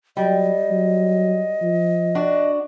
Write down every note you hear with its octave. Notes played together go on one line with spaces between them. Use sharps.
F#3 G3 D#5
F#3
F3
D4 F#4